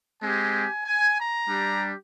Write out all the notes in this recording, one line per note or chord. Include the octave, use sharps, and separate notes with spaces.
G#3 C4 G4 G#5
G#5
A#5
G3 D4 G4